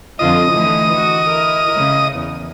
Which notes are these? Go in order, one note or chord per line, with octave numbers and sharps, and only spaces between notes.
F2 D3 F4 D#5
D3 E3 A3
F#4
E4 A#4
C#3
E2